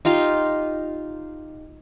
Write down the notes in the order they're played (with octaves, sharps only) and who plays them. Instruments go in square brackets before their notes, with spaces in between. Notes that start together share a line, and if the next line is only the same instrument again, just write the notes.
[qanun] D#4 F4 G4 F5